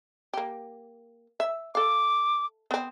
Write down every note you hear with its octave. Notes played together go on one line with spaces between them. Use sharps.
A#3 G4
E5
A4 F5 D6
B3 C4